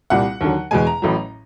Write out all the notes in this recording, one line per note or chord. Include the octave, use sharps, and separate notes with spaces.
C2 A#2 G3 F#5
D#2 D3 F#3
E2 B2 G#3 G#5
A#5
A1 A2 F#3